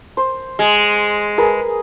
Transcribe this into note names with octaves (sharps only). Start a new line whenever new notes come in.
C5
G#3
G#4 A#4 B4